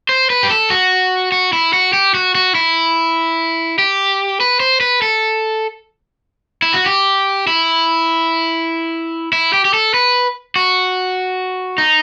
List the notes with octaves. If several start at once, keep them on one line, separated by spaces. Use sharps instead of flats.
C5
B4
G4
A4
F#4
F#4
E4
F#4
G4
F#4
F#4
E4
G4
B4
C5
B4
A4
E4
F#4
G4
E4
E4
G4
G4
A4
B4
F#4
D#4